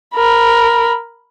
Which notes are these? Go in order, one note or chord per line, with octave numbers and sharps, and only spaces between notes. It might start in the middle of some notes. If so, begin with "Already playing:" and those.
A#4 B5